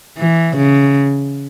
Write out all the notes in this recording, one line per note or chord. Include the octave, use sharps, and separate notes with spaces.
E3
C#3